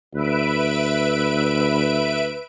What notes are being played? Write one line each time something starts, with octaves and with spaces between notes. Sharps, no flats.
D2 B4 E5 D7